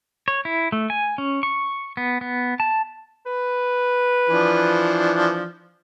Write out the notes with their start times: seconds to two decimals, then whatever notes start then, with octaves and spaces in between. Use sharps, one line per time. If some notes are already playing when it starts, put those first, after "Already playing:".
0.28 C#5
0.45 E4
0.72 A3
0.90 G#5
1.18 C#4
1.43 C#6
1.97 B3
2.21 B3
2.60 A5
3.26 B4
4.29 E3 F3 D4